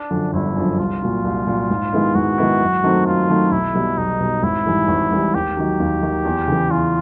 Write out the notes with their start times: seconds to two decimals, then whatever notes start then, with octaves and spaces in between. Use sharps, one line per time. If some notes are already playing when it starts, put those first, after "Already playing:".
Already playing: D4
0.11 F#2 D3 F3
0.33 G1 E4
0.56 F#2 D3 F3
0.79 C2 F4
1.02 A#2 F#3
1.24 C2
1.47 A#2 F#3
1.70 G#2
1.92 D#3 G#3 B3 E4
2.15 G#2 F#4
2.38 D#3 G#3 B3 E4
2.61 F#2
2.84 D#3 F#3 A3 C4
3.06 F#2 F4
3.29 D#3 F#3 A3 C4
3.52 B1 E4
3.75 B2 G3
3.97 B1 D#4
4.20 B2 G3
4.43 G#1 E4
4.66 G#2 E3 G3
4.88 G#1
5.11 G#2 E3 G3
5.34 D#2 G4
5.57 D#3 F#3
5.80 D#2
6.02 D#3 F#3
6.25 E2
6.47 C#3 E3
6.71 E2 F4